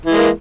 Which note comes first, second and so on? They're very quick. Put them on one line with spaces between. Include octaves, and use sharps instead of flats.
E3 G#3 A#3